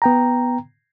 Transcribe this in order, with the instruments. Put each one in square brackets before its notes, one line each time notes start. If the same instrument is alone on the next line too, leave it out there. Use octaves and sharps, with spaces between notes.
[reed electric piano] B3 G5 A#5